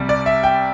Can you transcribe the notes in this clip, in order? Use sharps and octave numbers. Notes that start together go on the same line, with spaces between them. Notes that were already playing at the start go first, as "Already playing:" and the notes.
Already playing: C2 C3 G3
D5
E5
G5